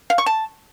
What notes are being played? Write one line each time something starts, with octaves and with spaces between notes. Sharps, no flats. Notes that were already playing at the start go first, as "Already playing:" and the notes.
F5
C#6
A5